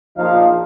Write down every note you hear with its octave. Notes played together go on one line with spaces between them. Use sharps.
A#1 A#2 F3 D#4 F5